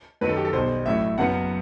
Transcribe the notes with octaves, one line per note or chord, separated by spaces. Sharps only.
F#2 D#3 F#3 B4
A4
G4
A4
B1 B2 G3 C5
A1 A2 F#3 E5
F#1 F#2 F#3 B3 F#5